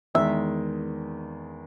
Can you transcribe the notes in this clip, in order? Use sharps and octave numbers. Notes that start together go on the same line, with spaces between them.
E2 D#3 G#3 E5